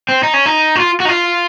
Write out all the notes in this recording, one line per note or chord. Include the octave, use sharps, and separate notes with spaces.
C4
D#4
C#4
D#4
F#4
F4
F#4
D#4
F4